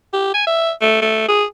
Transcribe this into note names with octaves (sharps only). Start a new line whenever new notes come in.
G4
G#5
E5
A3
A3
G#4